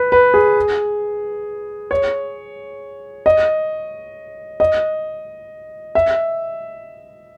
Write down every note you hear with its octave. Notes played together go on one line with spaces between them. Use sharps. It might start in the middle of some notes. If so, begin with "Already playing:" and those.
Already playing: B4
B4
G#4
C#5
D#5
D#5
E5